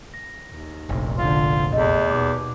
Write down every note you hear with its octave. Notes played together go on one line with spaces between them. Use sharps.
A#6
D#2
F1 A#1
D3 F4
E2 C3 A3 D#5
D#2 B2 D6